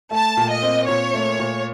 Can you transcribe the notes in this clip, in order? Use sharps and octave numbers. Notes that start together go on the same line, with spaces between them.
A3 A5
A#2
D#5
C4
A#2 C#5
A3
A#2